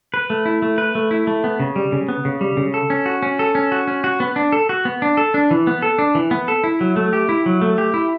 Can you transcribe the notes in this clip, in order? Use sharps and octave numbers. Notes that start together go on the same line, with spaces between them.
B4
A3
E4
A3
B4
A3
E4
A3
B3
C#3
G3
C#3
B3
C#3
G3
C#3
A4
C#4
F#4
C#4
A4
C#4
F#4
C#4
F#4
B3
D4
A4
F#4
B3
D4
A4
D4
E3
B3
A4
D4
E3
B3
A4
E4
F#3
A3
G4
E4
F#3
A3
G4
E4